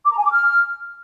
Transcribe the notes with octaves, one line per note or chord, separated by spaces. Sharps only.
D6
A#5
G#5
D6
F6